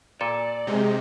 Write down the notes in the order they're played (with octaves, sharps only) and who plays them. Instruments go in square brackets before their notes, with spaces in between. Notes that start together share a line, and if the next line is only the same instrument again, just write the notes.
[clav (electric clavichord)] A#2 A4 G#5 [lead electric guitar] D5
[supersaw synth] C3 [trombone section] G#3 [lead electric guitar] D#4